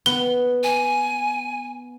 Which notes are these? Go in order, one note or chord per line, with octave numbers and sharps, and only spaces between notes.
B3 G7
G#5